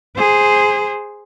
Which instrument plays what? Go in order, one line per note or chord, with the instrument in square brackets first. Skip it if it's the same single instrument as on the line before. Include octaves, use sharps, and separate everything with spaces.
[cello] G#4 C5